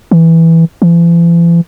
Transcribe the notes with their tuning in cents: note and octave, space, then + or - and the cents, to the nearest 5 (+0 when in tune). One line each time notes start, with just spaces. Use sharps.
E3 -5
E3 +45